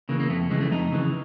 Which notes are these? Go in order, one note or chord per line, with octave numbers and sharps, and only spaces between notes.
C#3 E3 A#3
A#3
F2 A3
C#3 E3 G#3
A3
F2 D#4
C#3 E3